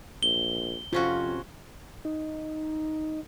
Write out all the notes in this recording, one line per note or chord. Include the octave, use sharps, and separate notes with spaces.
A#1 G7
F2 C3 C#4 F4 F#4
D#4